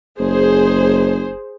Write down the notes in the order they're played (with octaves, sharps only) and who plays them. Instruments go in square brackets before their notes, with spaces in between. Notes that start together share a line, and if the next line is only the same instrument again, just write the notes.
[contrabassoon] F#1 [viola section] G#4 C5